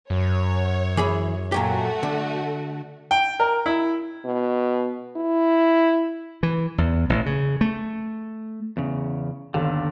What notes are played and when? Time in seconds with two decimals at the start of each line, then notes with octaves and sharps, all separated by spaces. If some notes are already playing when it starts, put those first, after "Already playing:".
0.10 F#2 C#5
0.97 E3 G#4 B5
1.52 A#2 F#3 A3 F#4 G4
2.03 D3
3.11 G5
3.40 A#4
3.66 E4
4.25 B2
5.17 E4
6.43 E3
6.78 E2
7.10 A1
7.26 C#3
7.61 A3
8.77 E2 C#3
9.54 G1 D#2 D3